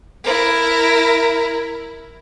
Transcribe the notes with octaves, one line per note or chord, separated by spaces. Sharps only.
E4 A#4